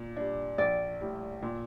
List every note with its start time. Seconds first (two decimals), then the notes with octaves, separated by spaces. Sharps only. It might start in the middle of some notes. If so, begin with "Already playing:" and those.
Already playing: A#2
0.17 G3 D4
0.58 A#1 D5
1.01 A2 G3
1.42 A#2